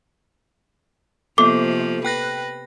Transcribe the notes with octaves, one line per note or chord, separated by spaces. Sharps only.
C3 F3 A#3 B3 A4 D6
B4 G5 F#6 A#6